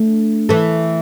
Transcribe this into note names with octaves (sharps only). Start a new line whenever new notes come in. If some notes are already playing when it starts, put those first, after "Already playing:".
Already playing: A3 D4
E3 A3